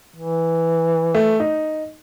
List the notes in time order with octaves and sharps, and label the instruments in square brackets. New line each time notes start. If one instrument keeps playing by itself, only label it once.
[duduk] E3
[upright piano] A3
D#4